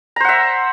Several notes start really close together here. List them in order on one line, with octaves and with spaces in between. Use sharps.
A#5 C5 F#5 E5